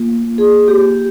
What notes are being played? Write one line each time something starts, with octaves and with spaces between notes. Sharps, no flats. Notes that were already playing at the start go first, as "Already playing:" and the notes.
Already playing: A#3 F4
G#4
G4